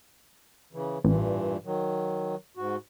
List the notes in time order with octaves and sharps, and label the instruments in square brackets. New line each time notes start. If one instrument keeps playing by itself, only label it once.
[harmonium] C#3 E3
[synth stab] A1 [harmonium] G2 A#2 E3
[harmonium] D#3 F#3
G#2 F#4